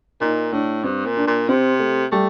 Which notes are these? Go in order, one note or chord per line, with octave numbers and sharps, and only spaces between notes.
A#2 D#4
A2 D4
G2 C4
A#2
D4
A#2
C3 C4
A3
G3 A3